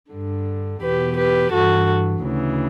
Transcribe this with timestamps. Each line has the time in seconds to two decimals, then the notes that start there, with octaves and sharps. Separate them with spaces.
0.11 G2 D3
0.82 E2 B2 G4 B4
1.17 G4 B4
1.52 G2 E3 F#4 A4
2.23 D2 C#3 E3